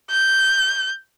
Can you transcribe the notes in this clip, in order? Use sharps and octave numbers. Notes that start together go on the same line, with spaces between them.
G6